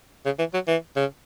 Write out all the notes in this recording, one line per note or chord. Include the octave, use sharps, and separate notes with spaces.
C#3
E3
F#3
E3
C#3